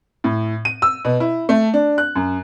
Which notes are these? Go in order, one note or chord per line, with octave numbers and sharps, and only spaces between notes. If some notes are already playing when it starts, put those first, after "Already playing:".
A2
D#7
E6
B2
E4
A3
D4
F#6
F#2